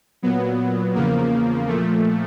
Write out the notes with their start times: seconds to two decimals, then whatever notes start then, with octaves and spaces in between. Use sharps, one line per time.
0.22 A#2 F#3 B3
0.95 E2 C#3 F3 A#3
1.68 A#2 F3 A3